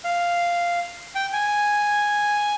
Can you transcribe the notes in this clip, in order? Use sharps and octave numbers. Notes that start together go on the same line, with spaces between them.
F5
G5
G#5